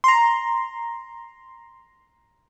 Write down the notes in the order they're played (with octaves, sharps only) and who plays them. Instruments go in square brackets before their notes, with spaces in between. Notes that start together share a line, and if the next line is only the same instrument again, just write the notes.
[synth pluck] A#5 C6